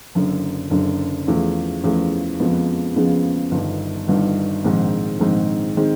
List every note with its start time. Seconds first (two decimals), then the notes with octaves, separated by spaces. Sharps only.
0.15 F#1 F#2 D3
0.70 F#1 F#2 D3
1.27 E2 C#3 F3 A3
1.83 E2 C#3 F3 A3
2.40 F2 C#3 F3 G#3 B3
2.96 F2 C#3 F3 G#3 B3
3.51 G1 G2 D#3
4.08 G1 G2 D#3
4.64 A#1 G#2 D#3 G#3 C4
5.20 A#1 G#2 D#3 G#3 C4
5.77 D#3 G#3 C4